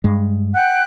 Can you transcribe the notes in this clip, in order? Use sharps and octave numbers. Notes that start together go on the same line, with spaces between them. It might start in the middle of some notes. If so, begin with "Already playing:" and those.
G2 G#3
F#5 G5 F#6